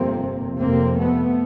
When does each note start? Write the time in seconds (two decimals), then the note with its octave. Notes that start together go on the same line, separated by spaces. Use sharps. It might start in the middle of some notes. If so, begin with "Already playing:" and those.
Already playing: G1 F2 C3 A#3 C4
0.60 F1 F2 C3 A#3 C4
0.98 A3 B3